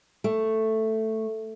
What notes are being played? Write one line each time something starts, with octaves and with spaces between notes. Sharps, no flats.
A3